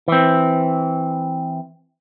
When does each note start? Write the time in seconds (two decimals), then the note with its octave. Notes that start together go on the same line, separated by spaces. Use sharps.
0.08 E3 C4